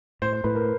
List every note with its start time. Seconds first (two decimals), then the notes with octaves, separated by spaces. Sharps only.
0.22 A2 C5
0.33 C5
0.44 A2 B4
0.55 A#4